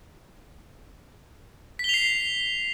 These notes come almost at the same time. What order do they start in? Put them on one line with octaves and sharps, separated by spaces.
B6 G7 F7 C7